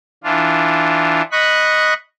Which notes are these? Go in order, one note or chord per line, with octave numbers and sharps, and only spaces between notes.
E3 D4 F4
D#5 B5 C#6 F#6